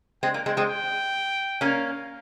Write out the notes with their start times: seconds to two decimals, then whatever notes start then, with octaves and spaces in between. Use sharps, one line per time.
0.23 G#3 C4 G5
0.34 A#3
0.46 G#3 C4
0.57 G#3 C4
0.69 G5
1.61 A#3 C#4 F5